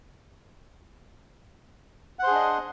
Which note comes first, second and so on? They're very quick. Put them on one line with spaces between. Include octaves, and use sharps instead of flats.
F#5 C5 G#4 D4 D#5